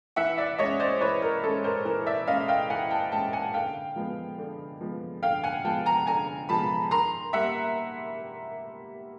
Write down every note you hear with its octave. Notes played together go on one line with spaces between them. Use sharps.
E3 E5 F#5
D5 E5
G#3 C#4 C#5 D#5
C5 D5
E3 B4 C#5
A#4
G#3 C#4 A4
A#4 C5
E3 A#4
D5 E5
G#3 C#4 D#5 F5
F5 G5
E3 F#5 G#5
G5 A5
G#3 C#4 G5 A5
F#5 G#5
D3 F5 G5
F3 G#3 B3
D3
F3 G#3 B3
D3 F5 G5
F#5 G#5
F3 G#3 B3 G5 A5
G#5 A#5
D3 G#5 A#5
F3 G#3 B3 A5 B5
D#3 A#5 C6
G3 A#3 E5 F#5